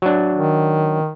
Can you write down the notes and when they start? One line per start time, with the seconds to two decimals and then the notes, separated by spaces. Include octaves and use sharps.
0.02 F#3 D4
0.34 D#3